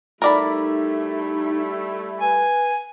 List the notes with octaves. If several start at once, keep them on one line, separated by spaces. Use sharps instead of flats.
G3 A3 D#4 E4 A#4 D5 B5
B4 G#5